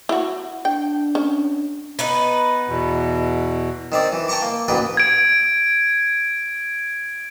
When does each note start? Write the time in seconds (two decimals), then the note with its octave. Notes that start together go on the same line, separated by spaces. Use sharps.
0.09 E4 F#4
0.65 D4 G5
1.15 C#4
1.99 B3 D#4 B4
2.68 E2 B2
3.92 D#3 C4 D5
4.12 E3
4.28 G5 A5 A#5 C#6 D6
4.42 A#3
4.68 A1 D2 A#3 B4 G5
4.97 G#6 D7